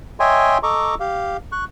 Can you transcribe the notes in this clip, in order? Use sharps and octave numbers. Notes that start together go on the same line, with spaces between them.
C#5 D#5 E5 G5 G#5 C6
A4 D#5 A#5 C#6 D6
G4 F5
C#6 F#6